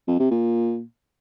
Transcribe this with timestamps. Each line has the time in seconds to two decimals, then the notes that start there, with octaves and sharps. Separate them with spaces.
0.08 F2
0.19 C3
0.31 A#2